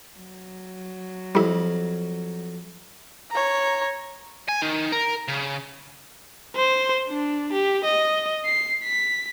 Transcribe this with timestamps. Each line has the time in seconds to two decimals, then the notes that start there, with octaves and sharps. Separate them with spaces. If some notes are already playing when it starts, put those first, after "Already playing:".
0.18 F#3
1.35 F2 G3 E4
3.31 C#5 A#5
4.49 G#5
4.62 D#3
4.92 A#4
5.28 C#3
6.56 C5
7.09 D4
7.52 G4
7.84 D#5
8.46 C7
8.84 B6